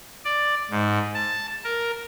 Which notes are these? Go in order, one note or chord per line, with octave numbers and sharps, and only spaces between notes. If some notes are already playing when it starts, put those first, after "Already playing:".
D5
G#2
A5
A#4